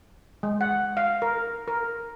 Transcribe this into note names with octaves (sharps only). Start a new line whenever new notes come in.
G#3
F#5
F5
A#4
A#4